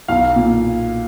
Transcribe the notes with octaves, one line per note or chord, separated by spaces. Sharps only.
B1 F5
A#2